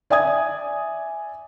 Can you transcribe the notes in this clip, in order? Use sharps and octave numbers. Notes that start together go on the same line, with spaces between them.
D5 E5 G#5 D#6 G#6